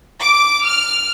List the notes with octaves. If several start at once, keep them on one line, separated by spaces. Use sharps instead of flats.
D6
F6